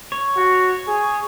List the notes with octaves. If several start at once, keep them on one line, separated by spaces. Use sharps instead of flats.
C#5
F#4
G#4